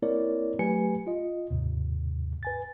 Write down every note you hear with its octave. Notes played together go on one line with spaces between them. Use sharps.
A#3 C4 E4 A#4 C#5 D5
F#3 A3 G4 B4 G#5 C#7
F4 D#5
D#2 G#2 C3
B4 G#5 A6